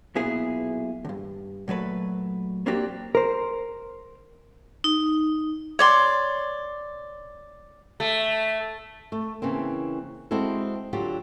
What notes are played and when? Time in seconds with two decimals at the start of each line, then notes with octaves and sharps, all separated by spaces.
0.15 B1 A#2 B3 E4 G#4
1.05 D2 G2
1.68 A#2 F#3 A3 B4
2.66 F#3 A#3 C4 D4 F#4 G4
3.15 A#4 C5
4.84 D#4
5.79 C#5 D5 C6
8.00 A3
9.12 A3
9.42 C#3 E3 A#3 C4
10.31 G#3 C4 E4 F#4 A4
10.93 D3 F#3 F4 G4